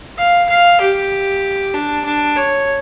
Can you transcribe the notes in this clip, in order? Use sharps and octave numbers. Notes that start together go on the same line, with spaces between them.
F5
F5
G4
D4
D4
C#5